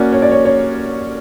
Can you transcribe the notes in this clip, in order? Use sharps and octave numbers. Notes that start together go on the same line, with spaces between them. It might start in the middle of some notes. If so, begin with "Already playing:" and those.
Already playing: A#3 C#4 F#4 D5
C#5
D5
C#5
C#5